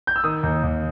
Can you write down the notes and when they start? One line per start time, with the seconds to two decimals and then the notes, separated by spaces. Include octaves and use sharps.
0.07 G6
0.16 E6
0.24 D#3 D#6
0.43 D#2
0.63 D#2